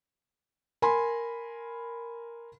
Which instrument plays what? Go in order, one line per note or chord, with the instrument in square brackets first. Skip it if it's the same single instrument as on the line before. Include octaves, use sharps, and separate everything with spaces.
[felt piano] A#4 G#5 B5 C6